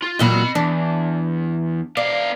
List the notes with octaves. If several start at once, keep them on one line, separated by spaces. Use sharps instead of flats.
F4
E2 A#2 F#3 D#5 B5
E2 D4
B3 D5 F5